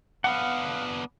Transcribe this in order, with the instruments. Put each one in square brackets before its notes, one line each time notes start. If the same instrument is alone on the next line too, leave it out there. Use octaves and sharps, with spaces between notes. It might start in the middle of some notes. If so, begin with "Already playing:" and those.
[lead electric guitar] B3 D4 [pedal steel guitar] F5 F#5